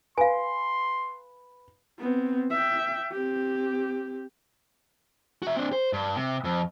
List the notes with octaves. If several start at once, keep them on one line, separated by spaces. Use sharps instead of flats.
B4 F5 G#5 C6
B3 C4
E5 G5
C4 G4
F#4 E5
C4 D4
C5
G2
C3
F2